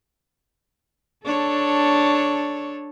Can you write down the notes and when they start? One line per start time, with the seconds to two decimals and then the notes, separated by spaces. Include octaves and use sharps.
1.24 D4 A4 C#5